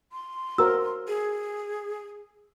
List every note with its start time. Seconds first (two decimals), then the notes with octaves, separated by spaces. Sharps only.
0.12 C6
0.58 F#4 A#4 C5 E6
1.08 G#4